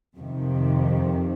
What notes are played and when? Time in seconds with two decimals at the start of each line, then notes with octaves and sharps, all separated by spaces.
0.17 F2 C3 D#3